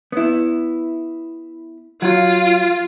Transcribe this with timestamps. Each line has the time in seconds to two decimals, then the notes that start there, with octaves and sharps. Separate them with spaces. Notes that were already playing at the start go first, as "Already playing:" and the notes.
0.12 B3 E4
2.02 F#3 F4